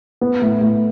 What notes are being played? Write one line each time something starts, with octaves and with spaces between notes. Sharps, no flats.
B3
A2
A2